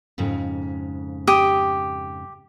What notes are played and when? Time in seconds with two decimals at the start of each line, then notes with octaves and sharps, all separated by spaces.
0.18 F2 G#2 C#3
1.27 G4 D#6